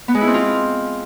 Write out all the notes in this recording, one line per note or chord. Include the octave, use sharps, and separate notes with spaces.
B3
G#3
E4
C4
F4